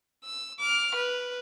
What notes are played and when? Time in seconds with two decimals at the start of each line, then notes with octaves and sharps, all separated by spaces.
0.24 E6
0.60 D6 F6
0.96 B4